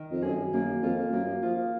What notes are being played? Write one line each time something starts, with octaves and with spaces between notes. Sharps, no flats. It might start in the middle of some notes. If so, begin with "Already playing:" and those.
Already playing: D#3
F2
F#2 G#4
F#2 A#3
F2 F4
F#2 A#3
F3 F4